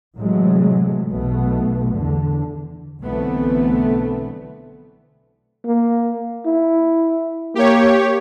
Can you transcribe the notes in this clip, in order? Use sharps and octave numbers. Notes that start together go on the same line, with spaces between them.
A2 C3 E3 F#3 G#3 A3
B1 B2 A3 B3
E2 D3
B1 D3 E3 A3 B3 C4
A#3
E4
A#3 G4 C#5